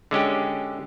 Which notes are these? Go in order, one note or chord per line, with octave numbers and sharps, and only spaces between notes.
D3 G#3 C#4 G4